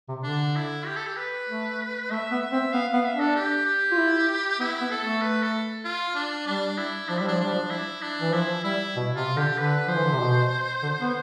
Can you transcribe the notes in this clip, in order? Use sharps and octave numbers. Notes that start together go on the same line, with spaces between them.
C3
D3 D4
E4
G4
A4
G4
B4
A3
A3 E5
B3
E5
C4
B3 F5
B3 F5
E5
D4
A4
G4
G4
F4
E4
B3 E4
B3
A4
A3
B4
A4
F4
D4
G3 D4
E4
F3 D4
G3 E4
D4
F3
G3 D4
F3
E4
D4
E3
F3 E4
G3 E4
B2
C3 F4
D3 G4
D3 B4
F3 C5
E3
D3
C3
B2
D3
B3